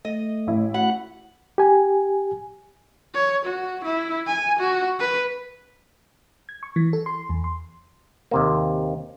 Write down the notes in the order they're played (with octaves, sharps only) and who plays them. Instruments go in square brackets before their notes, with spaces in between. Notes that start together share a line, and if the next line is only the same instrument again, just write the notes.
[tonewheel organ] A3 [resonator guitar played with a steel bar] D#5
[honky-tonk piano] A1 E4
[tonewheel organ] F#4 B5 F#6 [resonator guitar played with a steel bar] F#5
[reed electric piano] G4 G#5
[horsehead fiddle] C#5
F#4
E4
G#5
F#4
B4
[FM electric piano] G#6
C#6
E3
A4
C6
E2
C6
[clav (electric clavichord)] D#2 C3 A#3